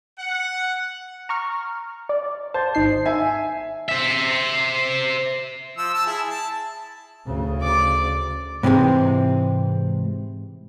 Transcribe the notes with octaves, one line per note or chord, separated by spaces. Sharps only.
F#5
A#5 C#6 F6
D5
C5 A5
G#1 D#4 C7
E5 G#5
C5 E5
F3 E6
A5 E6
E4 G#4
A5
D2 C#3
D5 D6
G#2 C3 E3 G#3 C4